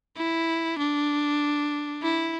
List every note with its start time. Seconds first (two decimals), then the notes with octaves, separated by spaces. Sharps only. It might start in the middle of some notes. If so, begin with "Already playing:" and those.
0.17 E4
0.79 D4
2.03 E4